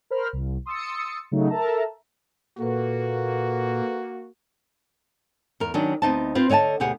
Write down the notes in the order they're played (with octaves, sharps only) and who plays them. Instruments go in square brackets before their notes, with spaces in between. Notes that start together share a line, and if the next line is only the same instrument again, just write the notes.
[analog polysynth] A#4 C5 B5 F6
C2
C6 D#6 E6 A6 C#7
C#3 F#3 A3 D#4
A4 A#4 E5 A5 A#5
[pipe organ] A#2 [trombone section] A#3 F#4 [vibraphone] A4 B4
[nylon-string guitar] E2 A#4
D#3 F#3 C#4 D4
D2 B3 C4 D#4 D#5 A5
C4 F4 B4 C5
D3 C#5 D#5 G5 A5
D2 B2 G4 G#4 F#5